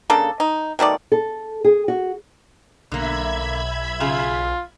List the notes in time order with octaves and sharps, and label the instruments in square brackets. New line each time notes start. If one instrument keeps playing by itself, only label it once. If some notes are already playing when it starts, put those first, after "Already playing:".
[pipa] C#3 A#3 D4 A4
D#4
B2 D#3 A3 D5
[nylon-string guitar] A4
G#4
F#4
[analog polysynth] B1 [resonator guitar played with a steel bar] D3 A#3 [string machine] E5 B5 G#6
[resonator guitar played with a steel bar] C#3 G#4 [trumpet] F4